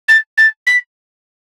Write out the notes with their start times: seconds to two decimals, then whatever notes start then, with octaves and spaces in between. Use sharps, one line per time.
0.08 A6
0.37 A6
0.67 B6